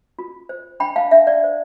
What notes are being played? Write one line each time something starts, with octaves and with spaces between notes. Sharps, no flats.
F4
C5
D4 G5 B5
F5 A5
D4 E5
D5
C5